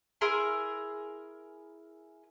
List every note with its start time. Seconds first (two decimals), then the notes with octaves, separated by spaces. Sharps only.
0.21 E4 G#4 A#4 C6